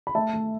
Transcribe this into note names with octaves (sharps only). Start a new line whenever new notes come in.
B5
A3 E5 A5
A3